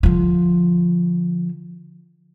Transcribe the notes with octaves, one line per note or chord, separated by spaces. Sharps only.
D3 F3